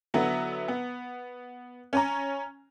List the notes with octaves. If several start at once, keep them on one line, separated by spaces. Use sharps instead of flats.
D3 F#3 B3 E4
B3
C#4 G#5 A#5